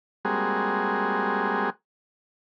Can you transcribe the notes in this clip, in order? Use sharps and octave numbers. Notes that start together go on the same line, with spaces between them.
G3 G#3 A#3 C4 F#4 G#4